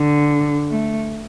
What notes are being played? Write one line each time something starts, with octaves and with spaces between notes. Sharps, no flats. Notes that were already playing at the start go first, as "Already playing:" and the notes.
Already playing: D3
A3